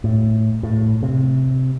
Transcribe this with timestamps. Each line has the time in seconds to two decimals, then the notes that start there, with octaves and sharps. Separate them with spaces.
0.04 A2
0.63 A2
1.03 C3